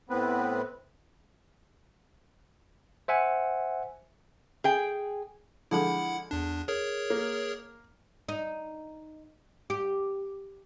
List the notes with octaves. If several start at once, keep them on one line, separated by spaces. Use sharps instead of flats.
A2 B3 C4 B4
C5 E5 F#5 G#5
G#4 G5
D3 F3 G#3 E4 F#5 B5
E2 D4
G#4 A#4 C#5
A#3
D#4
G4